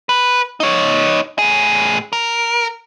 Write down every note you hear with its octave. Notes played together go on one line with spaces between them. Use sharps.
B4
D#4 C#5
A2 G#4
A#4